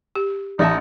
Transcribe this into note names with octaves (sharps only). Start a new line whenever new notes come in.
G4
A1 D#4 D5 E5 A5